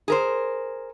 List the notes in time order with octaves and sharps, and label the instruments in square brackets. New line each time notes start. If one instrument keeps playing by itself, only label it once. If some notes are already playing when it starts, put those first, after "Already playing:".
[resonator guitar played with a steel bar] G#4 A#4 C5